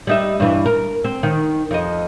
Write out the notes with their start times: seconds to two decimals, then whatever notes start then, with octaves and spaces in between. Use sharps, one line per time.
0.07 G3 D#4 E5
0.40 G2 E3
0.66 A#4
1.04 C4
1.23 D#3
1.71 F2 D#5